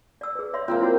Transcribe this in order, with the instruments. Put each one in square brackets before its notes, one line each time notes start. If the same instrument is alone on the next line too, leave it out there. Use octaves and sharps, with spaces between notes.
[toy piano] D5 E6
G#4 B4
C#5 E5 C6
[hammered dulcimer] A#3 C4 G5 [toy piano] F4
[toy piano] E4 F#4 C5